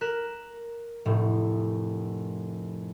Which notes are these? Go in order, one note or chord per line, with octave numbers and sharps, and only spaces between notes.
A#4 F#6 B6 E7
F1 A2